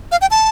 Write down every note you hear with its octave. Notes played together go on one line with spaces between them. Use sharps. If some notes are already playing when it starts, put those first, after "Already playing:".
F5
G5
A5